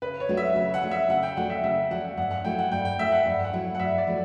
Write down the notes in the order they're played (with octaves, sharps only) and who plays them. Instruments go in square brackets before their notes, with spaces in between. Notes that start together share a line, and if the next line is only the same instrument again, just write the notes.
[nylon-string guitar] C#3 [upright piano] B4
[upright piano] C#5
[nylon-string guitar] F#3 A3 D4 F#4
[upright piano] E5
[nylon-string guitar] C#3
[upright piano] F#5
[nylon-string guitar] F#3 A3 D4 F#4
[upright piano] E5
[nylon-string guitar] C#3 [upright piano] F#5
[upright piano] G5
[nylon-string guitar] F#3 A3 D4 F#4 [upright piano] F#5
[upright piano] E5
[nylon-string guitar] C#3 [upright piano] E5
[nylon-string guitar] F#3 A3 D4 F#4 [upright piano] F#5
[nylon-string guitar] G2 [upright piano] F#5
[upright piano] F#5
[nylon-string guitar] F#3 A3 E4 [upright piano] G5
[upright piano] F#5
[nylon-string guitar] G2 [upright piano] G5
[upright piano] G5
[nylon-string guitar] F#3 A3 E4 [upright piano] E5
[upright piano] F#5
[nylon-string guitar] G2
[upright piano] F#5
[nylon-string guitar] F#3 A3 E4
[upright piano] F#5
[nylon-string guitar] G2 [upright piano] E5
[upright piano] D5
[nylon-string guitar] F#3 A3 E4